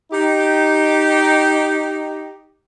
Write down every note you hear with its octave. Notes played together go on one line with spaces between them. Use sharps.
D#4 G4